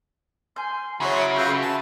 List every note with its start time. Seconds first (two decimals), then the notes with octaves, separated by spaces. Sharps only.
0.56 G#5 C6 G6
1.01 C#3 F#3 E4 G#4 C#5 F#5 C6
1.20 D7
1.36 F#3 F4 F#4 B4 E5 G6
1.62 G#5 A5